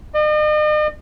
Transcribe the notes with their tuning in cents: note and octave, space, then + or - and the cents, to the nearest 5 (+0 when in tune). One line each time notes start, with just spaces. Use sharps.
D#5 -45